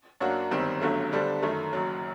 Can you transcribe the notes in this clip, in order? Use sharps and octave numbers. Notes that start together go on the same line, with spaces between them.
F#2 F#3 A#3 D4 F#4
G1 F#2 D#3 G3 C4
G1 G2 D3 F#3 A3
D3 G3 D4 A4 C5
F#2 D#3 A3
F#1 F#2 F#3